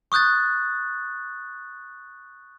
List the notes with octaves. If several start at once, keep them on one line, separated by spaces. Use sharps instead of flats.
C#6 D#6 F#6 G6 A6